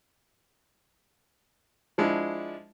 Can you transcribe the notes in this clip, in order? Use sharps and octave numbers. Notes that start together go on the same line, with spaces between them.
F3 G#3 D4 E4